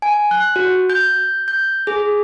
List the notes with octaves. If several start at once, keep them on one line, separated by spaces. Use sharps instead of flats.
G#5
F#6
F#4
G6
G6
G#4